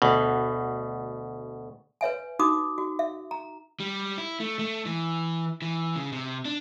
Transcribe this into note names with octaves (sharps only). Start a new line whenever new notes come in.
D2 B2
B4 C#5 E5 G#5
D#4 F#4 D6 D#6
F#4
E5
A#5
G3
E4
A3
A3
E3
E3
C#3
C3
D4